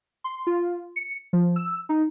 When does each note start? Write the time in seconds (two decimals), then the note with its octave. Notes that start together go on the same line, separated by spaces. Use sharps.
0.24 C6
0.47 F4
0.96 C#7
1.33 F3
1.56 E6
1.89 D#4